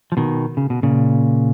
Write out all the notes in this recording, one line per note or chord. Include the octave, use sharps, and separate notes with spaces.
F3
B2 D#3
C#3
B2
A#2 C#3